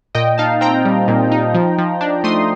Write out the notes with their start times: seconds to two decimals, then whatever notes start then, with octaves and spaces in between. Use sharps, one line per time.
0.15 A#2 D#5 G5
0.38 D#4 F5 A5
0.61 C4 G5 A#5
0.85 G3
1.08 A#2
1.32 D#4
1.54 F3
1.78 F3
2.01 D4
2.24 A3 C6 D#6